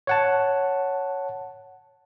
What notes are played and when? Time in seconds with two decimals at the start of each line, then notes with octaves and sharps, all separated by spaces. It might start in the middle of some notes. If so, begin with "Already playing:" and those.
0.07 C#5 F#5 A5